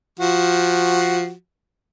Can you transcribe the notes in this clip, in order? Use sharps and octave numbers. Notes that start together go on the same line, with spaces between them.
F3 F#4